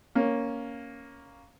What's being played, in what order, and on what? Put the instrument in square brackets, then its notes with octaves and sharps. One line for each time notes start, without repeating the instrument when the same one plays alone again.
[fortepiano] A#3 C#4